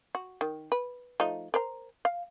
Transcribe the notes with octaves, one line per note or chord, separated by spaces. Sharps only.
F#4
D#3
B4
F3 A3 D#4
A#4 C5 A#5
F5